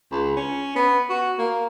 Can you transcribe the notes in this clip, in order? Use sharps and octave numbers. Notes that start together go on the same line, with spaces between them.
C#2
C#4
B3
F#4
A#3